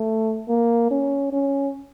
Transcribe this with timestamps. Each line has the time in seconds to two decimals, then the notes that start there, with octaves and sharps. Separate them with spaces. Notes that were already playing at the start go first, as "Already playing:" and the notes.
Already playing: A3
0.48 A#3
0.91 C#4
1.33 C#4